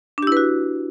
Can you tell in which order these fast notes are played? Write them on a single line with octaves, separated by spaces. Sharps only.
D4 G4 E4 B4 F#4